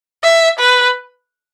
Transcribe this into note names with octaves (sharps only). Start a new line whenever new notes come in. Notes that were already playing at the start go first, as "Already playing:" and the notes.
E5
B4